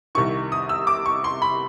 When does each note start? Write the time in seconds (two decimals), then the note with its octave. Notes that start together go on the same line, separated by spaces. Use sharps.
0.15 C2 C3 D#3 C#6
0.52 D#6
0.69 E6
0.87 D6
1.06 C#6
1.24 C6
1.42 B5